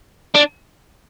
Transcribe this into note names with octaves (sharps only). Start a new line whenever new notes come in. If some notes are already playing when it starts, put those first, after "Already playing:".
D4